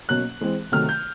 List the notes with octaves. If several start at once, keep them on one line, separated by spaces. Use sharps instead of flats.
B2 F#3 A#3 C#4 F#6
E3 G#3 C4
C3 D#3 F#3 A3 F6
G6